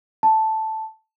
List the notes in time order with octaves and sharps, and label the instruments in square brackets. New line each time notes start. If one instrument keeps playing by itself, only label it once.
[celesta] A5